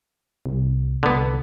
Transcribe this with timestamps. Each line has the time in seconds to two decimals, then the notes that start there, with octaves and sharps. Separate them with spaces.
0.46 C2
1.03 C2 D3 B3